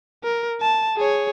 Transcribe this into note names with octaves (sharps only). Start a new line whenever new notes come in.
A#4
A5
G#4 C#5